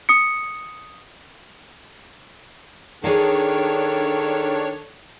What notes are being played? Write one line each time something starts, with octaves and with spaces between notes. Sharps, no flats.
D#6 C#7
D#3 D4 G#4 A4 C#5 F5